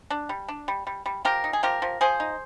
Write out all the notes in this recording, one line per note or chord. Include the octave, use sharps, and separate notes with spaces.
D4
G3
D4
G3
G3
G3
F3 G4 A#4
D#4
G#4
F3 G4 A#4
F3
F3 G#4 C5
D#4